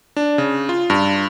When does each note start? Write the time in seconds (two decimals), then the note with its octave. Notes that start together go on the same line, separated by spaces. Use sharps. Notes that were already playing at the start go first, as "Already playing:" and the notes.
0.17 D4
0.38 C#3
0.69 F4
0.90 G2